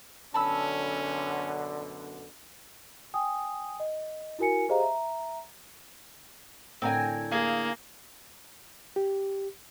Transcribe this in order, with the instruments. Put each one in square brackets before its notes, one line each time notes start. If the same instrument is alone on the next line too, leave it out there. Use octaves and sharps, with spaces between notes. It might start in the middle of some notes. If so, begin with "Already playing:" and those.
[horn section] F#2 B2 D3 [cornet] C#4 [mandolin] A5 B5 E6
[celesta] G5 G#5 D#6
D#5
E4 F#4 A#4 G#5 C#7
G4 G#4 C5 D#5 F5 A#5
E5 A#5
[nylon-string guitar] A2 D3 [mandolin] C4 A#4 G#5
[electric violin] A#3 [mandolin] G#4 F5
[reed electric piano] G4